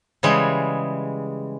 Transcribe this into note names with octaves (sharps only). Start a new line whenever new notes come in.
C#3 E3 G3 G#3